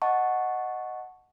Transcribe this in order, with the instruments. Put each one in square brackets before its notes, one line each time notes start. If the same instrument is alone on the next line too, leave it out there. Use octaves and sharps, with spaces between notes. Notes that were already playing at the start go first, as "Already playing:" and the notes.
[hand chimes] D#5 F#5 A5 C#6